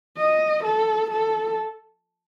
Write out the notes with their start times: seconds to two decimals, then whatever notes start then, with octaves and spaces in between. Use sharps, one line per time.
0.17 D#5
0.63 A4
1.10 A4